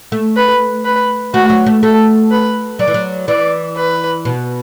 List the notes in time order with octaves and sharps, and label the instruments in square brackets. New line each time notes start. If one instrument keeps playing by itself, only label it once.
[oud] A3
[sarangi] B4
B4
[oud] A3 [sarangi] F#4
[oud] F#3
A3
[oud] A3 [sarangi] A4
[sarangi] B4
[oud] F#3 [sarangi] D5
[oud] E3
F#3
[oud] E3 [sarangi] D5
[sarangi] B4
[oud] B2